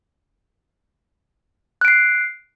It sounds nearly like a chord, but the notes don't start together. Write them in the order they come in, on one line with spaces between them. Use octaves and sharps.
F#6 D7 C7